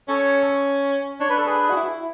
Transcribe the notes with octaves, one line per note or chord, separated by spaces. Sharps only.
C#4 A4 C#5
D4 C#5
B4
A4
G#4 B4
F#4
E4